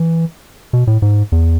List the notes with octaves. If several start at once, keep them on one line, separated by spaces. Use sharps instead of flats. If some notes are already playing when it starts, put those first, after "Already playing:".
Already playing: E3
B2
A2
G#2
E2